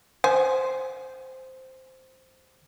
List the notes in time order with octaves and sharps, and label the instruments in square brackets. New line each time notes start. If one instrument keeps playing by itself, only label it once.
[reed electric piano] C5 [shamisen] G#5